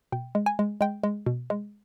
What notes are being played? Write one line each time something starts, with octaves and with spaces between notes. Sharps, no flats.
B2 G5
G#3
G#5
G#3
G#3 G5
G#3
B2
G#3